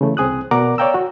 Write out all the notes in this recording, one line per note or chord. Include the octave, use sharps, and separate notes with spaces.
C#3 E3 A3
C2 C4 G#4 D#6 F#6
B2 A#4 D5 F#5 A#5 D6
C#5 D5 F5 G5 A#5 E6
F#4